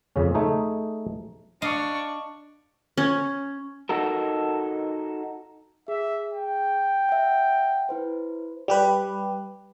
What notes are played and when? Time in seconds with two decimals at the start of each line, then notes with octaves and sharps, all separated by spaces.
0.16 F2 C#3 C#4
0.34 A3 D#4 G#4
1.62 D4 D#5 F5 C#6
2.97 C#4
3.89 D#4 F#4 A4 A#4
5.88 G#4 E5
6.34 G5
7.09 E5 F#5
7.89 E4 B4 C5
8.68 G3 G4 B4